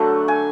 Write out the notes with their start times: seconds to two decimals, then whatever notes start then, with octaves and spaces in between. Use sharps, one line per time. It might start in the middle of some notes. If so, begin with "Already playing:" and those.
Already playing: D3 F#3 A3 F#5
0.28 G#5